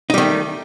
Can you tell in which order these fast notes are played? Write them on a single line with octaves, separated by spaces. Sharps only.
D#4 G3 D#3 A3